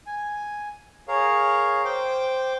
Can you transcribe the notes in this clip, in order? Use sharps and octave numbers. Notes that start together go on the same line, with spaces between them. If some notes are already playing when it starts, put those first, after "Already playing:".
G#5
G#4 A#4 C#5 F5
C5 G5 D6